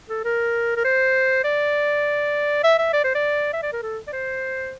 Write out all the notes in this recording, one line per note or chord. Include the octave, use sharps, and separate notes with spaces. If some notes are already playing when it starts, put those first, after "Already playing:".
A4
A#4
A#4
C5
D5
E5
E5
D5
C5
D5
E5
D5
A#4
A4
D5
C5